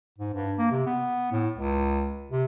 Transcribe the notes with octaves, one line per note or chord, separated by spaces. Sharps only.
G#2
G2
A#3
C3
B3
A2
C#2
C3